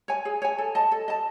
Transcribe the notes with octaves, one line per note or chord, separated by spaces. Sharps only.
C#5 G#5
G#4
C#5 G#5
A4
D#5 A5
A4
D#5 A5